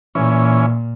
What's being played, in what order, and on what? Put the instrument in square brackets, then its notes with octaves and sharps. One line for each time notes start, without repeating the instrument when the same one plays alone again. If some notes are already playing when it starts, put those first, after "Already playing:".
[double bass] A#2 [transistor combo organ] E3 C#4